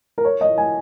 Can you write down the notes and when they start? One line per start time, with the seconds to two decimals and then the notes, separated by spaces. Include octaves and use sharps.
0.18 A#4
0.25 C#5
0.41 D#5
0.58 G#5